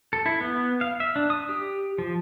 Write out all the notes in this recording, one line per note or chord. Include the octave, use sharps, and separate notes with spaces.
A4
E4
B3
F5
E5
D4
D#6
G4
F3